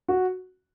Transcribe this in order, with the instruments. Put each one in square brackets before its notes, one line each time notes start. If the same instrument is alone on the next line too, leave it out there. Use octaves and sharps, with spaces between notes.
[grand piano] F#4